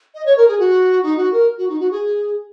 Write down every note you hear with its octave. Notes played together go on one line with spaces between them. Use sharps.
D#5
C#5
A#4
G#4
F#4
D#4
F#4
A#4
F#4
D#4
F#4
G#4